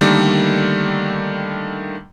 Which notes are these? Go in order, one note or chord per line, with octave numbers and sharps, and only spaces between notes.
D3 D#3 G3 A3 A#3